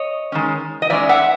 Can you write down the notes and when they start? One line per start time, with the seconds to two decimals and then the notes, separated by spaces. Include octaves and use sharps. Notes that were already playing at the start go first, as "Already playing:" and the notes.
Already playing: C#5 D#5
0.32 D#3 G#3 C#4
0.82 D#5
0.90 D#3 G#3 C#4 D5 E5
1.09 E5 F#5